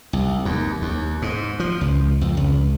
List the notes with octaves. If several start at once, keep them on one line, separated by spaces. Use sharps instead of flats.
C2
D#2
D#2
G#2
F3
C#2
F2
C#2